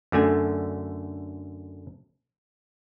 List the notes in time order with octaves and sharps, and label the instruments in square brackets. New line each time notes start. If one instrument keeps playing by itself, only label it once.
[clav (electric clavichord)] F#2 D3 A3 G#5